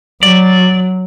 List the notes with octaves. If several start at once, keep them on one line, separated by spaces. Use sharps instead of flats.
F#3 D5